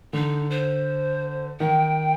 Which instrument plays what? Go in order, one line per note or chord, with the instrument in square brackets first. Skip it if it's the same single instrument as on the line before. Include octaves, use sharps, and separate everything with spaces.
[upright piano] D3 [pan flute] D#4
[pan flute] C5
[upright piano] D#3 [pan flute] G5